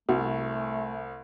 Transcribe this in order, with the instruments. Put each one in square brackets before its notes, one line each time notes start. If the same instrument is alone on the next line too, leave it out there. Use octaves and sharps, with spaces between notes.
[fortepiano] C2 [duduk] A3 [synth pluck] F#4